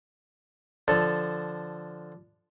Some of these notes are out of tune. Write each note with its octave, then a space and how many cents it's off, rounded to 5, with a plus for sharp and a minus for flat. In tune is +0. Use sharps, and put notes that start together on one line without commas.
D3 +0 F3 +0 A4 +0